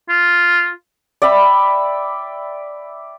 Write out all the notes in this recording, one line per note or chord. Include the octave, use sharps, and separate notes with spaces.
F4
D5 E5 G5 B5